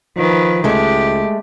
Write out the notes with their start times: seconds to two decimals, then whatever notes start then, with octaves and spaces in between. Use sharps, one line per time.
0.17 D#3 F3 B4
0.64 C#2 G#3 A3 G4